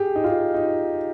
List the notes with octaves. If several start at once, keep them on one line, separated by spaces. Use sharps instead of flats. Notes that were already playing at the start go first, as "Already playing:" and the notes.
Already playing: G4 G#4
D#4
F4
D#4